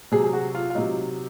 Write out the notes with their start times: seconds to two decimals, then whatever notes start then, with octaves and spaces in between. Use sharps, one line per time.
0.12 C3 F#3 G#4
0.24 G#4
0.33 F#4
0.55 F4
0.70 F4
0.75 C3 F#3 D#4